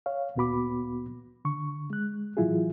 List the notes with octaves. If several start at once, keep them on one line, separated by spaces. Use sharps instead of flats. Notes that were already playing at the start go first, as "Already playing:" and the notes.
C#5 F5
D2 A#2 B3 F#4 B5 D6
D3 C#6
G#3 F#6
A2 E3 F#3 E4 F4 G#4